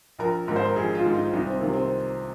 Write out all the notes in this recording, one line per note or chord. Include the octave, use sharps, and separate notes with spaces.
A#1 A#4
G#2 D#3 A#4
C5
A#4
A#1 G#4
F4
G#2 D#3
D#4
C2 D#4
C4
C3 D#3 A#3
C4